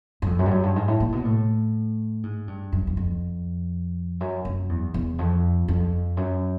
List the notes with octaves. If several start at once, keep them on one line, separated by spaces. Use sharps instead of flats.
F#2
F2
F#2
G2
F#2
G2
G#2
A2
A#2
B2
A2
G#2
G2
F#2
E2
F2
F#2
F#2
E2
E2
F2
F2
F#2